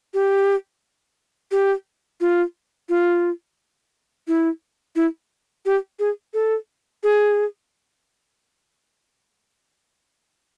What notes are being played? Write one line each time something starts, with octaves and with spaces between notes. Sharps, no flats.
G4
G4
F4
F4
E4
E4
G4
G#4
A4
G#4